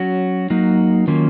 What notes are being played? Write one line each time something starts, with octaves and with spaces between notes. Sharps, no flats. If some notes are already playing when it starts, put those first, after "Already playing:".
Already playing: F#3 C#4 F#4
F#3 A#3 D#4 F#4
D#3 F#3 A#3 C#4 F4